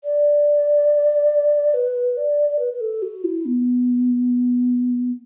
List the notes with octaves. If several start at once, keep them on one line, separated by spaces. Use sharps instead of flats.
D5
B4
D5
D5
B4
B4
A4
F#4
E4
B3